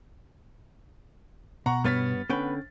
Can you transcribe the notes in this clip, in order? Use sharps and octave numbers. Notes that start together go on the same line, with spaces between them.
B2 F#5 A#5 C#6
G2 B3 C#5 F6 A6 B6
D3 B3 C#4 B4 G5